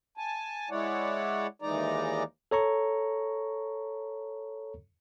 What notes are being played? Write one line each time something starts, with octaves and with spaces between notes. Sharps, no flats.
G#5 A5
G#3 E4 C#5 D5 F#5
D#2 E3 G#3 D#4 D5 A#5
A4 C#5 A#5 C#6